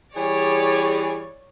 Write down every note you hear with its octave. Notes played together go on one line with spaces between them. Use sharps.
E3 G3 G#4 C#5 D5